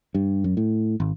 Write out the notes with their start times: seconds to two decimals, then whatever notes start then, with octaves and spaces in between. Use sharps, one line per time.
0.14 G2
0.44 F#2
0.57 A2
1.00 G#1